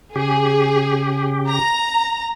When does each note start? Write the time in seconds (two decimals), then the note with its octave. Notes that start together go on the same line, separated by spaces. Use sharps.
0.16 C#3 G4 G#4
1.50 A#5